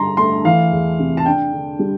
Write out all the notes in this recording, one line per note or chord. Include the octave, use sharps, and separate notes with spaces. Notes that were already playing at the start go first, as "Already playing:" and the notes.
Already playing: G2 D3 A#5 C6
A3 C6
E3 F5
E2
C3
A5
D4 G5
D3
G3